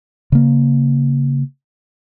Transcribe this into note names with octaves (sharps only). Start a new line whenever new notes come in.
C#3 A#3